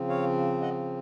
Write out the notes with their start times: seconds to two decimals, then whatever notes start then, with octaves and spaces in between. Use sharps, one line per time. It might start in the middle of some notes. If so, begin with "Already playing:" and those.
Already playing: C#3 F3 C4
0.09 C#5 F5
0.61 D#5 F#5